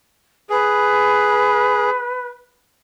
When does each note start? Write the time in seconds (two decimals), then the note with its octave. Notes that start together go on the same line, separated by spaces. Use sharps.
0.50 G#4 B4